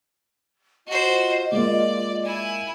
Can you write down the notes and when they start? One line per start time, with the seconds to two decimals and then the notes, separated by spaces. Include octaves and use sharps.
0.87 F4 F#4 C5 D#5
1.52 G#3 A#3 D5
2.25 E4 G#5